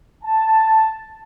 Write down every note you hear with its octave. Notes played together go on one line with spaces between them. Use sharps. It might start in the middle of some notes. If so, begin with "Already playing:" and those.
A5